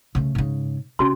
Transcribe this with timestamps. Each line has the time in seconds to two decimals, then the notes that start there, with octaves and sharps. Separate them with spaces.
0.15 C#3 A3
0.35 G#2 C#3
0.99 C#3 C#4 F#4 C6